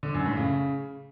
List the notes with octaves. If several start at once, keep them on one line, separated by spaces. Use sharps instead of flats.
D3
F#2
A2
C#3